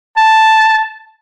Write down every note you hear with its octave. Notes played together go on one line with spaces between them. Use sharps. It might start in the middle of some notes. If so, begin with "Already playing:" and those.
A5